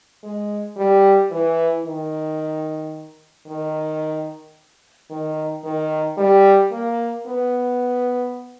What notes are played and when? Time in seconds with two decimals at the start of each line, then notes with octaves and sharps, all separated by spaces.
0.23 G#3
0.77 G3
1.31 E3
1.86 D#3
3.47 D#3
5.10 D#3
5.64 D#3
6.18 G3
6.72 A#3
7.27 B3